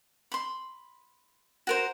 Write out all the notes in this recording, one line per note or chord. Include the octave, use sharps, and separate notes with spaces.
B5 C6
F#4 A#4 C5